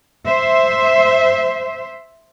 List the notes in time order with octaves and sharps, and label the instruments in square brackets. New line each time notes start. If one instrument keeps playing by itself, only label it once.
[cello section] C5 E5